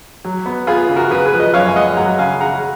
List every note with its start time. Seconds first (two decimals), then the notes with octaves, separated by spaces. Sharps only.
0.25 F#3
0.46 B3
0.67 B3 F4 G#4
0.89 C#3
0.96 F#4 A#4
1.11 C#3 G#4 B4
1.26 G#4 B4
1.33 F3
1.40 B4 D#5
1.54 F#2 C#5 F5
1.68 G#5
1.75 G#3 D#5 F#5
1.97 F#3 F#5 A#5
2.19 C#3 F5 G#5
2.40 C#3 F#5 A#5